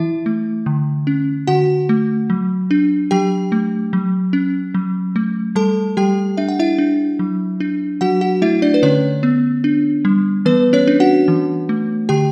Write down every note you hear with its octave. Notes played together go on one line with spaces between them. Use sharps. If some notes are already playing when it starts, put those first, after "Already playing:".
Already playing: E3 E4 E5
A3
D3
C#4
D3 F#4 F#5
A3
F#3
D4
F#3 G4 G5
A3
F#3
C#4
F#3
A3
G3 A4 A5
G3 G4 G5
D4 E5
F#5
E4 E5
D4
F#3
D4
F#3 F#4 F#5
F#4 F#5
A3 E4 E5
D4 D5
B4
D3 C#4 C#5
B3
D4
G3
E3 B3 B4
C#4 C#5
D4
F#4 F#5
E3
A3
D3 G4 G5